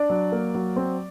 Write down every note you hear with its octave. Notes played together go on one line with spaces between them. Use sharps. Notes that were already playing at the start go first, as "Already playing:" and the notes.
Already playing: D4 D5
F#3
A#3
F#3
C4